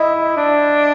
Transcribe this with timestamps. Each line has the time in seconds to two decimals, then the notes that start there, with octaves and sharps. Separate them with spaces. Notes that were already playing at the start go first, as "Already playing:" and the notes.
Already playing: E4 D#5 E5
0.37 D4